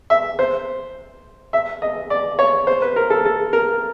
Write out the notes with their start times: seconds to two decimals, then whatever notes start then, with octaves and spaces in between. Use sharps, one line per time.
0.10 E5
0.39 C5
1.53 E5
1.82 D#5
2.10 D5
2.39 C#5
2.67 C5
2.82 B4
2.96 A#4
3.10 A4
3.25 A4
3.53 A#4